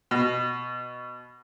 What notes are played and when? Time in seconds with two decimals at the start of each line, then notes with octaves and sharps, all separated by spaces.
0.11 B2